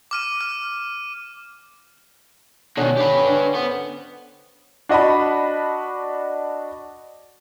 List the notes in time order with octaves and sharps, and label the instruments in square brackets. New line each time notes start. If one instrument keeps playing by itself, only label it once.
[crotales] D6 F6 D#7
F6
[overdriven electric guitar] B2 D#3 [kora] D3 [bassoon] C#4
[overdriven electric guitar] G4 B4
[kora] D3
[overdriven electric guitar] B3 [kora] C5
[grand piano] D4 F#4 D#5 A5 B5